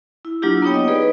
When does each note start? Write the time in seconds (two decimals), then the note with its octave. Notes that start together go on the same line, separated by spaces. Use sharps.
0.25 E4
0.42 F#3 A#3 D4 E4 F4 G4
0.62 A#3 B3 D#4 C#5 G5
0.74 D#5
0.88 D#4 G#4 B4 D5